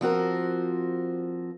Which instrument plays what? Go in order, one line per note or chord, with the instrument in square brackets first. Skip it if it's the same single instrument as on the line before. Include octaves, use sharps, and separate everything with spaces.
[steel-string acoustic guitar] F3 C4 F#4 A#4